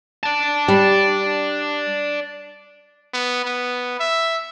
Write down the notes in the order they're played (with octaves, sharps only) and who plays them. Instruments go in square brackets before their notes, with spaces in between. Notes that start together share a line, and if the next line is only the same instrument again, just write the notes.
[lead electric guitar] D5 A5
[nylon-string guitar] G3
[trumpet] B3
B3
E5